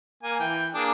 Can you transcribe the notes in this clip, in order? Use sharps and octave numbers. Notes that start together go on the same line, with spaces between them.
A#3 G#5
E3 G5
A#3 D4 G#4